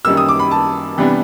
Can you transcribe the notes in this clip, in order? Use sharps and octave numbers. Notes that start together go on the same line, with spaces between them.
F#2 D#3 G3 A#3 E6
D#6
D6
B5
A5
C3 E3 G3 B3 D4